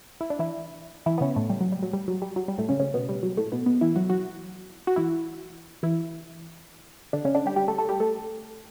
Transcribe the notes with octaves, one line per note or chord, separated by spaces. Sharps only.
E4
D4
E3 E4
E3 E4
B3
C#3 C#4
A2 A3
G3
F#3
G3
F#3
G3
F#3
G3
F#3
G3
A2 A3
C#3 C#4
C#3 C#4
B2 B3
G3
F#3
A2 A3
B2 B3
B2 B3
E3 E4
F#3 F#4
F#3 F#4
F#4
E3 E4
E3 E4
D3 D4
C#3 C#4
D3 D4
G3 G4
G3 G4
A3 A4
A3 A4
G3 G4
A3 A4